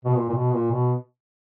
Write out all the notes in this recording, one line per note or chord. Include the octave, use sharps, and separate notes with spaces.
B2
A#2
A#2
B2
A#2
B2